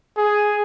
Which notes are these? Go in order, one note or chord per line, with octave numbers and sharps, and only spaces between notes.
G#4